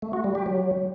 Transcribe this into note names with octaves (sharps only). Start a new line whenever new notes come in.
A3
F#4
G3
G4
F#3